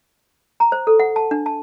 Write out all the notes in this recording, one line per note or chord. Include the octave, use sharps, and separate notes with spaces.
A#5
C5
A4
F#5
A5
D4
A5